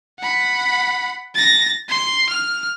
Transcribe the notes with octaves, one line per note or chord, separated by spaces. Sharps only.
F#5 B5
A6 A#6
C6
F6